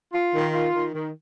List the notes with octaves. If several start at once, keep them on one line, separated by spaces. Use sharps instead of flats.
F4
D#3
F4
D#3
D#3